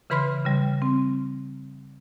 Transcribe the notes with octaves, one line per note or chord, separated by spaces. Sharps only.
C#3 E3 B4 B5 C6 F6
C#3 G3
C4